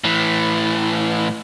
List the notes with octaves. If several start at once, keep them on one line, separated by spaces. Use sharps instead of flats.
A2 E3